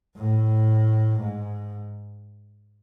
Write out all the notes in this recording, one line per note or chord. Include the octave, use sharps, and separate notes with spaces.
A2
G#2